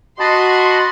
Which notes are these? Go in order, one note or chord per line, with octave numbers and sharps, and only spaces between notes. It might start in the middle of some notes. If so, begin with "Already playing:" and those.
F#4 D#5 A5 B5 C6